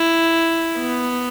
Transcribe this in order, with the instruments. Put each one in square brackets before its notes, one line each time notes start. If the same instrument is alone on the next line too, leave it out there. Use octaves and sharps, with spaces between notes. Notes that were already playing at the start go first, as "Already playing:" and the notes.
Already playing: [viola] E4
B3